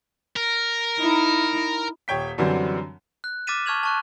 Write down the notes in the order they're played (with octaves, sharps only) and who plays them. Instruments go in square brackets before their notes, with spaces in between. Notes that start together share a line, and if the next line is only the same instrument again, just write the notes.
[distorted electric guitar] A#4
[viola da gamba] D#4 E4
[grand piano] D#1 C#5 G5 B6
F#2 D3 E3 F#3 G3 C4
[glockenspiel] F#6
D6 F6 A6 B6 D#7 E7
A5 C#6 F6 G#6 F7 F#7
A5 C#6 F#6